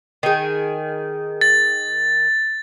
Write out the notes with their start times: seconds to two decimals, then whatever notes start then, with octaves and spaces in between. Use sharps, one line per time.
0.23 D#3 G#4
1.41 A6